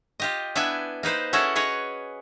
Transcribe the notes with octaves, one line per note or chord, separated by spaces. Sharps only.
F4 G4 D#5
B3 D4 E4 B4 G5 G#5
A#3 D#4 B4 C5
C#4 E4 F#4 G#4 A4
G#4 B4 C#5 D#5